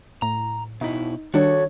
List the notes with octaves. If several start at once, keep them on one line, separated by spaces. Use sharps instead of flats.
A2 A#5
B2 D#4 E4
D#3 G3 D4 F#4 A4 C#5